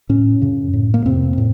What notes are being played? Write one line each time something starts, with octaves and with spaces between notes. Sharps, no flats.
A2 C#4
F#2 C#3
A2
A#3
F2 C3 C4
A2